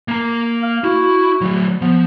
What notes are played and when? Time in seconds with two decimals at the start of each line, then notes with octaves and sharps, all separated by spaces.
0.08 A#3 A#5
0.63 F5
0.84 E4 F#4
1.41 F#3 A3
1.82 F3 B3